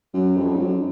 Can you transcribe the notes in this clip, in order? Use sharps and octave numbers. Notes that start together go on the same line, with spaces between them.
F#2
F2
G#2
F#2